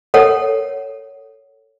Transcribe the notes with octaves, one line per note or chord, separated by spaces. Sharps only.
A4 A#4 C#5 F#5